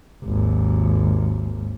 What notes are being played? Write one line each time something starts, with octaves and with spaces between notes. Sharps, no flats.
G#1 D#2